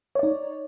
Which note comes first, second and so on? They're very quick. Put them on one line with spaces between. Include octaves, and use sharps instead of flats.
C#5 D5 D#4